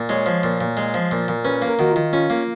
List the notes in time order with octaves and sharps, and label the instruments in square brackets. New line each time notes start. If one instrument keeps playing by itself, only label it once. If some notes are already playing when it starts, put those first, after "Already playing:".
Already playing: [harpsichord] A#2
[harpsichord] G#3 [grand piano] C#5
[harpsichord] F3
A#2
A#2
G#3
F3
A#2
A#2
[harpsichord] C#4 [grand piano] B4
[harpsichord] A#3
[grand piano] A#4
[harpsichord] D#3 [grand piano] F#4
[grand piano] F4
[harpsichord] D#3
[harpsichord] C#4 [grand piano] F4
[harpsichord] A#3